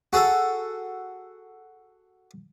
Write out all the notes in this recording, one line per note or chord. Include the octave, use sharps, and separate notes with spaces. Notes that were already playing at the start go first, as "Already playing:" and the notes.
F#4 G#4 A4